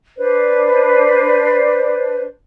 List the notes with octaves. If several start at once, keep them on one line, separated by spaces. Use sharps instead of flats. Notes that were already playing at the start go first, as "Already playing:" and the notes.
D4 B4 C5 D5